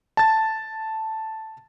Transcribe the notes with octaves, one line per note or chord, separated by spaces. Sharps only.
A5 A6